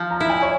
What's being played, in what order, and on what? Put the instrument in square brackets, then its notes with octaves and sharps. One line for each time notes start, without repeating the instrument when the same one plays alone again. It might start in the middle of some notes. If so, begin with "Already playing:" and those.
Already playing: [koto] F3
[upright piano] A#5
[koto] E4
[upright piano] G#5
C#5